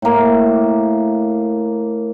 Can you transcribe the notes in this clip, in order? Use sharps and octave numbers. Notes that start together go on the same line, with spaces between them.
A2 A#3